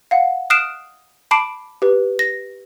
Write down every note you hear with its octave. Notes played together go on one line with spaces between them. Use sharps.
F5 F#5
D#6 F6 F#6 C7 D7 E7
A5 B5 D6 C7 D7
G4 B4
A#6